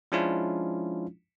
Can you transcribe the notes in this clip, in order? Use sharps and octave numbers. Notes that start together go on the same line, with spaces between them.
F3 G#3 C#4 D4 E4 F4